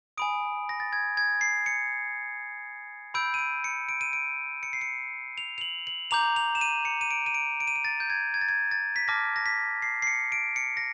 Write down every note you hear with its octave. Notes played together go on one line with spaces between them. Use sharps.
G#5 B5 D#6 D7
A#6
A6
G#6
G#6
C7
C#7
B5 E6 G6 D7
D#7
D7
C#7
D7
D#7
D7
C#7
C7
C#7
F7
F7
F#7
F#7
A#5 D6 G6 F7
F7
E7
D#7
C#7
D#7
D7
D#7
D7
D7
D#7
D7
A6
G6
G#6
G#6
A6
G#6
A6
B6
A5 D6 F6 A#6
A#6
B6
C7
C7
C#7
D7
C#7
A#6